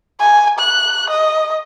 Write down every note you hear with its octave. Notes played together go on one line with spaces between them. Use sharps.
G#5
F#6
D#5